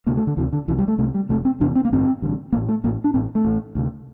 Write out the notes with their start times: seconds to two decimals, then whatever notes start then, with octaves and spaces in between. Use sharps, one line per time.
0.07 D2 C3 A#3
0.17 A3
0.27 D3
0.37 D2 C3 E3
0.53 D3
0.68 C2 E3
0.71 C3
0.79 G3
0.88 A3
0.98 C2 C3 A3
1.14 G3
1.29 E2 C3 A3
1.33 F1
1.45 C4
1.60 F1 E2 C3 D4
1.76 C4
1.85 A#3
1.91 A1 G2 D3 C4
2.22 A1 G2 D3
2.52 A1 A#3
2.57 A2
2.69 A3
2.84 A1 A2 A#3
3.04 D4
3.14 A1 A2 C4
3.35 A3
3.45 A1 A2
3.75 D2 C3